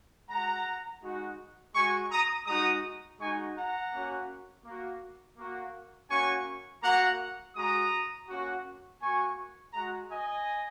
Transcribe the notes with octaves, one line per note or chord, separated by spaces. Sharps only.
G#3 F#4 F#5 A#5
G#3 D#4 F#4
G#3 F#4 G#5 C#6
A#5 D#6
G#3 D#4 F#4 A#5 D#6
G#3 D#4 F#4 G#5 C#6
F#5 A#5
A#3 C#4 F#4
A#3
F#4
A#3 F#4
A#3 C#4 F#4 G#5 C#6
A#3 F#4 F#5 A#5
G#3 F#4 A#5 D#6
A#3 C#4 F#4
A#3 F#4 G#5 C#6
G#3 F#4 F#5 A#5
D#5 G#5